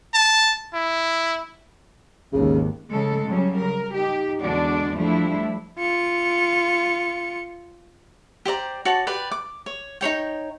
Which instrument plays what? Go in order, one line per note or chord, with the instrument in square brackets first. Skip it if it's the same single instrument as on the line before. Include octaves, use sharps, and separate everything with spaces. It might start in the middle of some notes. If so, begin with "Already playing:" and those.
[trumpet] A5
E4
[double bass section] G#1 D#2 [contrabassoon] C#3
[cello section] C#3 G#3 A4
C#3 F#3 G3 C#4
A#4
D#4 G4
E2 D3 G#3 D4 F#4 D5
F3 G3 A3 D4 E4
[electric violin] F4 C#7
[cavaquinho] G4 C5 D5 A#5
F#4 C#5 D5 A5
G4 B4 D5
D6
C#5
D#4 G#4 C#5 G5